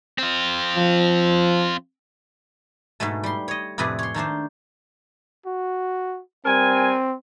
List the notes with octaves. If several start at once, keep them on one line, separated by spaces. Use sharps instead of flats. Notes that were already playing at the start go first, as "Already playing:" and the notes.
C4 F4
F3
G#2 B2 G#3 A3
G3 C6
C#5 D#5
F2 A2 C3 G#4 B4 D5
C#5 C6
D#3 A3 D4 C5
F#4
G3 C4 A#4 G#5